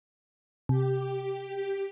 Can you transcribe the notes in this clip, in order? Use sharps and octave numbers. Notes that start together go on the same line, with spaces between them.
C3 G4